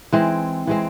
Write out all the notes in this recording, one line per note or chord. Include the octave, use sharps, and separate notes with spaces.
E3 G#3 C4
E3 G#3 C4